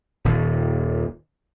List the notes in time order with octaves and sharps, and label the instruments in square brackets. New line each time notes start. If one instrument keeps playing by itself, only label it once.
[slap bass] D#1 D#2 A#2 D#3